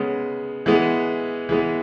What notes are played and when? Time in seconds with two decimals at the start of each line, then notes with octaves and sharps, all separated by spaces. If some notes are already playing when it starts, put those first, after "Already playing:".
Already playing: C#3 G#3 B3
0.66 E3 G#3 B3
1.49 E3 G#3 B3